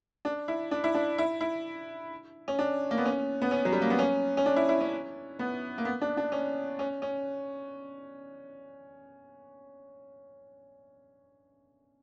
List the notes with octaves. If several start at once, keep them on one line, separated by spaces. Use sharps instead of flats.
D4
E4
D4
E4
D4
E4
E4
C#4
D4
A#3
B3
C#4
B3
C#4
F#3
G3
A#3
B3
C#4
C#4
D4
E4
E4
C#4
B3
A#3
B3
D4
D4
C#4
C#4
C#4